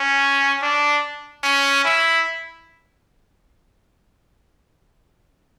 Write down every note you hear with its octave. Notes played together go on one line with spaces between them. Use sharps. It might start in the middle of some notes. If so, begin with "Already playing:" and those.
Already playing: C#4
D4
C#4
E4